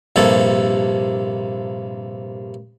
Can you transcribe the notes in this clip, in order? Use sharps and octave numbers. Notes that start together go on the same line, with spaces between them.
A#1 G2 C3 A#3 A4